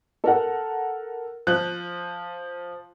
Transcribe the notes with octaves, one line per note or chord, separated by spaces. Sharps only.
A4 A#4 F#5
F3 F#6